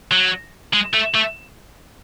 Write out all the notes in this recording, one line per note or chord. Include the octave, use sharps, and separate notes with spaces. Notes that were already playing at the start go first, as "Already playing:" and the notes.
F#3
G#3
A3
A3